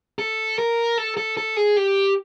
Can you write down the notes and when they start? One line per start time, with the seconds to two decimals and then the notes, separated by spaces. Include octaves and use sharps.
0.19 A4
0.58 A#4
0.98 A4
1.17 A4
1.37 A4
1.56 G#4
1.77 G4